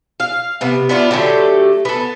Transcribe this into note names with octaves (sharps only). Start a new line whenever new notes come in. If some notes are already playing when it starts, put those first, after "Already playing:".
F5
C3 B3
B3 D4 E4 F4
D3 F#3 A3 G4
B3 A4